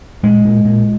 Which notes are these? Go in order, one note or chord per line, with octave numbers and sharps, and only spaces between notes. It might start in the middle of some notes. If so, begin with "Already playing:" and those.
A#2 G#3
A#2
A#2